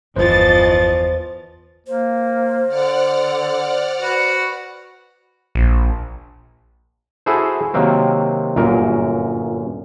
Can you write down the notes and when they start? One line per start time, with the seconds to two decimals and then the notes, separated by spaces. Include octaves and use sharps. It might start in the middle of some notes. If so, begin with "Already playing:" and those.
0.16 G1 E2 E3 F3 B4 C5 D#5 A6
1.87 A#3 C5
2.68 D3 D5 F#5 F6
4.02 F#4 B4
5.55 A#1
7.26 E4 F#4 G#4 A4 C5
7.74 C3 D#3 F#3 A#3 C4
8.56 G1 F#2 A#2 A#4